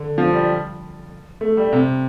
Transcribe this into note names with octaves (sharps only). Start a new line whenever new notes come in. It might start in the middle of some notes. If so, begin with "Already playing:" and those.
Already playing: D3
F3
G3
A3
G3
C3